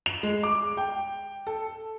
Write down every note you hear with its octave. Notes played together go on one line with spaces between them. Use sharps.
F7
G#3
D6
G5
A4